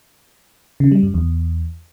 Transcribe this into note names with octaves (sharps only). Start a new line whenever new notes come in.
C#3
G3
F#2
E2